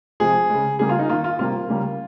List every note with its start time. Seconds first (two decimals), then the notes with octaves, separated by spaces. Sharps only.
0.20 C3 F3 G#3 G#4
0.50 C#3 G#3
0.79 C#3 G3 A#3 G#4
0.89 F4
0.99 D#4
1.09 D#3 A#3 F4
1.24 F4
1.39 C3 G3 A#3 F4
1.69 C#3 G3 A#3